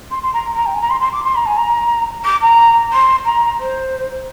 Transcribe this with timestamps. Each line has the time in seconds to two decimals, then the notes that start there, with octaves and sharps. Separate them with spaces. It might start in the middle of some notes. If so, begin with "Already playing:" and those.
0.10 C6
0.22 C6
0.33 A#5
0.55 A#5
0.65 G5
0.74 G#5
0.81 A#5
0.89 C6
1.00 C6
1.12 D6
1.24 C6
1.35 A#5
1.46 G#5
1.57 A#5
2.24 D6
2.41 A#5
2.92 C6
3.25 A#5
3.59 C5